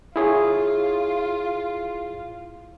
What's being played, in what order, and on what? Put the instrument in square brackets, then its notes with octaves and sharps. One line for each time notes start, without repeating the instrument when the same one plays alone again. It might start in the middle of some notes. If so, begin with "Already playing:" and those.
[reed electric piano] E4 G#4 C#5 [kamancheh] F4